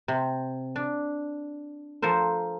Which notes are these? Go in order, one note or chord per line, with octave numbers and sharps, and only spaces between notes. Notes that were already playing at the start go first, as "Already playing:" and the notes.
C3
D4
F3 A4 A#4 C5